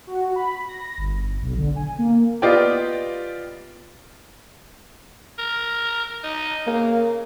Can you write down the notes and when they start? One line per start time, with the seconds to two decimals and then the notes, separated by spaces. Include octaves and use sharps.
0.07 F#4
0.36 B5
0.68 A#6
0.98 G1
1.42 B1
1.58 D3
1.76 G#5
1.99 A#3
2.42 B3 F4 G4 D5 D#5 G5
5.39 A#4
6.24 D#4
6.67 C#3 A#3